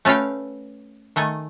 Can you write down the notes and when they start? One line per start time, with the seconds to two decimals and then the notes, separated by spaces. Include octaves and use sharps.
0.05 A3 C#4 B4 F5 G5
1.16 D#3 A3 D#5 G#5